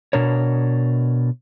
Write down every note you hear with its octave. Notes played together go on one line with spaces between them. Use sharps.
B2 D4 A#4 C#5